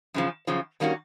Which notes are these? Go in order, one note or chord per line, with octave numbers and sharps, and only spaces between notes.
F#2 C#3 F3
F#2 C#3 F3
D#3 G3 A#3 C#4 F#4